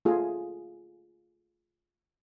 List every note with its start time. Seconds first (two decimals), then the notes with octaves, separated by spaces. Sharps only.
0.05 A3 F4 G#4